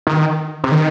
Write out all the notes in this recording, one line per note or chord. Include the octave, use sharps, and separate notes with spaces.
D#3
C3
D#3